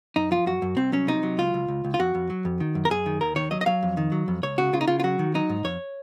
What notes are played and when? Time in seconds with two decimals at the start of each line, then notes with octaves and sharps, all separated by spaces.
0.16 F#2 D#4
0.31 F3 F4
0.46 F#2 F#4
0.62 F#2
0.77 C2 C4
0.92 F#3 C#4
1.07 C3 D#4
1.23 F#3
1.38 C#2 F4
1.54 C#2
1.68 C#2
1.85 C#2
1.94 F4
1.99 F2 F#4
2.15 F2
2.30 F#3
2.45 F2
2.60 D#3
2.75 F#2
2.85 A#4
2.90 F#2 G#4
3.06 D#3
3.21 D#2 A#4
3.36 D#3 C#5
3.51 F#3 D#5
3.61 D#5
3.66 F#3 F5
3.83 F2
3.97 D#3
4.12 F#3
4.28 F2
4.43 C#2 C#5
4.58 C#3 F#4
4.73 C#3 F4
4.81 D#4
4.88 C#3 F4
5.00 F4
5.04 F#3 F#4
5.19 D#3
5.35 F#3 D#4
5.49 G#2
5.64 F2 C#5